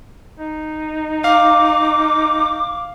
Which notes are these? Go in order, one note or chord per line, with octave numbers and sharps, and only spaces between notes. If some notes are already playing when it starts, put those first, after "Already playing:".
D#4
F5 D6